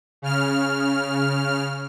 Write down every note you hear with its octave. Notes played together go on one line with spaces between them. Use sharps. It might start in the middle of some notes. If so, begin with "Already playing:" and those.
C#3 F6